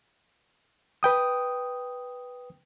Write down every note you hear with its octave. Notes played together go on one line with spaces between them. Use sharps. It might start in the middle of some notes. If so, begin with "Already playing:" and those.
B4 G5 D#6